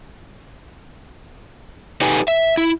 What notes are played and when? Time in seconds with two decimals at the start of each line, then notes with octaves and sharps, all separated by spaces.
2.01 D#4 G4 A4 B4 G#5
2.28 E5
2.57 E4